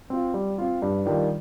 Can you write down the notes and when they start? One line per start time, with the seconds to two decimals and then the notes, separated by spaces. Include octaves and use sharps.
0.10 C4 F4
0.34 G3
0.58 C4 F4
0.82 G2
1.06 D#3 G3 D4 F4